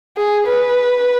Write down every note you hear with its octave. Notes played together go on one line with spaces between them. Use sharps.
G#4
B4